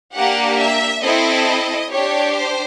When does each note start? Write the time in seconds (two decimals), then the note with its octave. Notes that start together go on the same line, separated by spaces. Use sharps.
0.15 A#3 D4 G4 F#5
0.59 E5
1.03 C4 E4 A4 D#5
1.91 D4 G4 C#5
2.36 C5